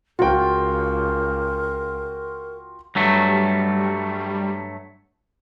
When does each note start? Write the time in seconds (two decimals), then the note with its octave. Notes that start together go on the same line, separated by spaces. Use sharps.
0.19 C#2 F4 F#4 A#4 G5
2.95 G2 F#3 G3 A3